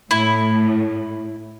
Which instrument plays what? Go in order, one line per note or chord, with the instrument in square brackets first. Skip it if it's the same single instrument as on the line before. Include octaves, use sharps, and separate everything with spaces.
[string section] A2 [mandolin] E4